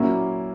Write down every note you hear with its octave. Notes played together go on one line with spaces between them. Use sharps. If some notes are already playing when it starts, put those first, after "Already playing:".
Already playing: A#2 F#3 A#3 C#4 E4